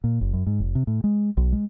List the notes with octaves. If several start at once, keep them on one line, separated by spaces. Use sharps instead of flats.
A#2
F#1
F#2
G#2
F1
C3
A2
G#3
B1
G#3